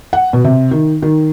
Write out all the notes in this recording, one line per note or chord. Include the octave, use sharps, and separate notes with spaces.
F#5
B2
C3
D#3
D#3